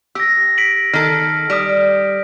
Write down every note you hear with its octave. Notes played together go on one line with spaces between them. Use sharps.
G4 E6 A#6
B6 D7 F#7
D#3 A4 F6
G3 D#6 B6 D7